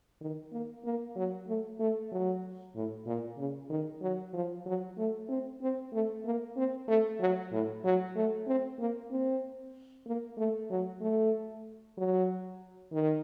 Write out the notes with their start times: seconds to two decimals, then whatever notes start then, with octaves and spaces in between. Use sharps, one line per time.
0.21 D#3
0.52 A#3
0.85 A#3
1.16 F#3
1.47 A3
1.80 A3
2.12 F#3
2.75 A2
3.06 A#2
3.38 C#3
3.70 D#3
4.02 F#3
4.33 F3
4.66 F#3
4.98 A3
5.29 C4
5.62 C4
5.93 A3
6.25 A#3
6.56 C4
6.88 A3
7.20 F#3
7.52 A2
7.84 F#3
8.15 A3
8.47 C4
8.79 A#3
9.11 C4
10.06 A#3
10.38 A3
10.70 F#3
11.01 A3
11.97 F#3
12.92 D#3